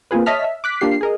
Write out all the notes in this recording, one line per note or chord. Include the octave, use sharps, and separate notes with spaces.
A#3 C4 F4 G#4 B4
C#5 D#5 E5 A5 F6 B6
E5
D6 F#6 B6
A#3 D4 F4 G4 C7
G#4 A#4 D#5